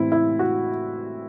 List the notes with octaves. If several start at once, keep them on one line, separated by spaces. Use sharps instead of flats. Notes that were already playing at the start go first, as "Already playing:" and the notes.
Already playing: A2 E3 C4 E4
E4
F#4